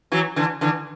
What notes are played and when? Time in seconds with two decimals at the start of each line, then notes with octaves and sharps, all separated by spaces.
0.12 E3 F#3
0.36 D3 E3
0.61 D3 E3